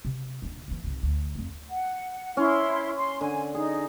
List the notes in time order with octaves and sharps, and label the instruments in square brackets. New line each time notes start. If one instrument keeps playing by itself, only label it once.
[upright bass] C3
D#1 D4
D#2 E3
C2 G#2
D2
F2 A3
[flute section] F#5
[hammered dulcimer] C#4 [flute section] E4 C6
[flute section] C6
[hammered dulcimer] D3 [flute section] G#5
[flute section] D#4 [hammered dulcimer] G#4